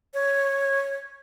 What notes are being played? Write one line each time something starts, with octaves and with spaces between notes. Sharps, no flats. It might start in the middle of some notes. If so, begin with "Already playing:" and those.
C#5